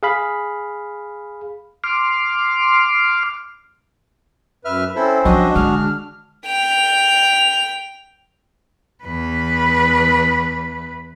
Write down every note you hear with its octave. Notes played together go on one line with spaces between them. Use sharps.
G#4 F5 B5
C6 D6 F6
F#2 B4 E5 F6
C4 C#4 E4 A4 C5
F3 G3 D4 F#4 D#5
D3 G#3 G#4 F6
D4
G5 F7
E2 B4